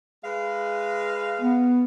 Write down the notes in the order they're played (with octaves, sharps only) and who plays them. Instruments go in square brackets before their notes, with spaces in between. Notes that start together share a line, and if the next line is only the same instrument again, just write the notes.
[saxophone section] G#3 B4 F5
[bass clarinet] B3